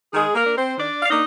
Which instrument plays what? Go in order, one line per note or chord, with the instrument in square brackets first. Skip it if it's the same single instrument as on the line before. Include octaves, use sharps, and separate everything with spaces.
[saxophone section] D#3 G#3 G#4
A#3 A#4
A#3 D4
C4 C5
D#3 D4 D5
F5
A#3 D4 D#4 D#5